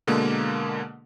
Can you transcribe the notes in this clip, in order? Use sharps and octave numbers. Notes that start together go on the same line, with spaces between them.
B2 D3 G#3 A#3